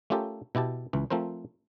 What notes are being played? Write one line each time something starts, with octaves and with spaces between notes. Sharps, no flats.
A3 C#4 F4 G4 A4 A#4
B2 E4 G4 A5
C#2 E3
F3 A3 C4 A#4 C5